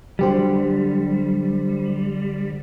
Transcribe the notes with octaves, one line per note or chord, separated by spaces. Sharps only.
D3 F#3 G3 G4 C5